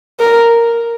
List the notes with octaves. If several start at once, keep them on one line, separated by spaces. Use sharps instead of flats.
A#4